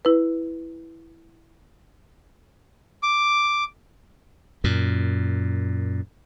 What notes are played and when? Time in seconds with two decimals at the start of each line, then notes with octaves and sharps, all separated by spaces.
0.05 E4 B4
3.03 D6
4.64 F#2 A#2